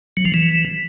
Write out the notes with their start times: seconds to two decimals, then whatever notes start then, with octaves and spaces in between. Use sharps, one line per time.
0.17 F#3
0.25 F3
0.34 E3